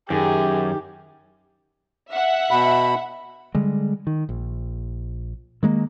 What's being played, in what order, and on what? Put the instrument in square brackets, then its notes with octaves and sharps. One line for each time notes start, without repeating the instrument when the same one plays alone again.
[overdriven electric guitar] F#2 [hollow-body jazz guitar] D#3 [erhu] G4 [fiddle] G#4
[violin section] E5 F#5
[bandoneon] B2 B5
[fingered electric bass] D3 G3 G#3
D#3
A#1
D#3 G#3 A#3